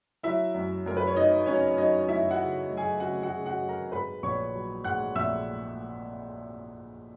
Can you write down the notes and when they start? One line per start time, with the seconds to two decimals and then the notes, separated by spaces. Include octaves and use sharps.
0.23 F#3 E4 E5
0.55 F#2
0.86 F#2 A#4
0.97 B4
1.07 C#5
1.16 F#3 D#4 D#5
1.46 F#3 C#4 C#5
1.78 F#3 D#4 D#5
2.08 F#2 E4 E5
2.31 F#4 F#5
2.40 C#3
2.70 F#2
2.77 G#4 G#5
3.00 C#3 F#4 F#5
3.23 F#4 F#5
3.32 C#3
3.46 F#4 F#5
3.62 F#3
3.69 A#4 A#5
3.92 G#2 B4 B5
4.23 A#1 C#5 C#6
4.53 F#3
4.84 G#2 F#5 F#6
5.15 A#1 E5 E6